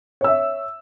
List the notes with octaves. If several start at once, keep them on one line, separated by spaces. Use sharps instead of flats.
C#5 E5 E6